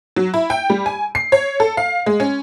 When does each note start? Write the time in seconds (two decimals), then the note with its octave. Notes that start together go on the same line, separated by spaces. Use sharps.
0.16 F#3
0.34 E4
0.50 G5
0.70 G3
0.86 G#5
1.15 C7
1.32 C#5
1.60 A4
1.77 F5
2.06 G#3
2.20 C#4